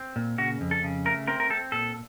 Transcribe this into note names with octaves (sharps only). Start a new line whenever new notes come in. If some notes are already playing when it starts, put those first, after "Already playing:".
Already playing: C4
A#2
C#3 F#4
F2
A4
C#3
A3 A#4
C4 A#4
A#4
C4 A4
A#2 A4